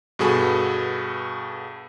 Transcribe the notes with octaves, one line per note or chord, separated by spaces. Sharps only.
G2 B2 F#4 G#4 A4 B5